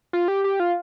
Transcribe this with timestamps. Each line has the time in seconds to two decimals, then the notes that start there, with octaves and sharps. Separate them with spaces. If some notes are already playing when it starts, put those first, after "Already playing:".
0.13 F4
0.28 G4
0.44 G4
0.60 F4